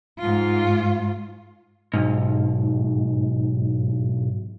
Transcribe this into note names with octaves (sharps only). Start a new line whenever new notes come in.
G#2 F4
B1 G#2